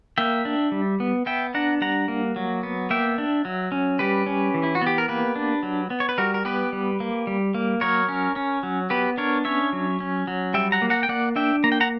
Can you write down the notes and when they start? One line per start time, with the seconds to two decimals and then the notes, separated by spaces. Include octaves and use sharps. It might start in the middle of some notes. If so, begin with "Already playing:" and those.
0.18 A#3 E5 G5
0.45 D4
0.72 G3
1.00 B3
1.26 B3 E5 G5
1.54 D4 F#5 A#5
1.81 G3 F#5 A#5
2.08 A#3
2.36 F#3
2.63 B3
2.90 A#3 E5 G5
3.18 D4
3.45 F#3
3.72 C#4
3.99 G3 G4 B4
4.27 C#4
4.54 E3
4.63 E4
4.75 F#4
4.82 B3
4.87 G4
4.98 A#4
5.08 A#3 G4 B4
5.36 D4
5.63 F#3
5.90 B3
6.00 C#5
6.09 B4
6.18 G3 F#4 A#4
6.34 A#4
6.45 B3 G4 B4
6.72 G3
7.00 A#3
7.27 G3
7.54 A#3
7.81 F#3 A#4 C#5
8.09 C#4
8.36 C#4
8.63 F#3
8.90 B3 G4 B4
9.17 D4 A#4 C#5
9.45 C#4 C#5 E5
9.73 F#3
10.00 C#4
10.27 F#3
10.54 G3 E5 G5
10.72 F#5 A#5
10.82 A#3
10.90 F#5 A#5
11.03 G5
11.09 A#3 D5 F#5
11.36 D4 E5 G5
11.64 A#3 A#5
11.72 G5
11.80 F#5 A#5